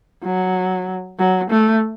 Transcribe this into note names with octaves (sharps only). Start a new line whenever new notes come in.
F#3
F#3
A3